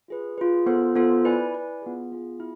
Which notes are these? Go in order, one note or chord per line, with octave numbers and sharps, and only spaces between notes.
F4 G#4 B4
F4 G#4 B4
B3 F4 A4 C5
B3 F4 A4 C5
E4 B4 D5 G#5
E4 B4 D5 G#5
B3 F4 G#4
B3 F4 G#4
E4